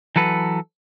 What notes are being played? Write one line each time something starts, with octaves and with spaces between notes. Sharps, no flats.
E3 F#3 A4 B4